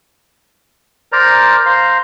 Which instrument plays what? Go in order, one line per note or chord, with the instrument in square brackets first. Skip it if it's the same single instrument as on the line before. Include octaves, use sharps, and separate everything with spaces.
[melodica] A#4 C5 D5 A#5
C5 F5 A#5 C6